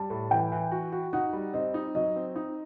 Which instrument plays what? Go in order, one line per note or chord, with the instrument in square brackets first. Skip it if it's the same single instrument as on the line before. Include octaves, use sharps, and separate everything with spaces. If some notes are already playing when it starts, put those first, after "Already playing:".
Already playing: [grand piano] G3 [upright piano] A5
[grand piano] A2
[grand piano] E3 [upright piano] G5
[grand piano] E3
F#4
F#4
[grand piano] D#4 [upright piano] F#5
[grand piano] G3
[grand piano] C4 [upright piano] D#5
[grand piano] D#4
[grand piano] F#3 [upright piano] D#5
[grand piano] C4
D#4